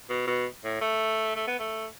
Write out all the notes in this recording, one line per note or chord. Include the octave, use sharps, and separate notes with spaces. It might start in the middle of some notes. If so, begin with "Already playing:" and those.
B2
B2
A2
A3
A3
B3
A3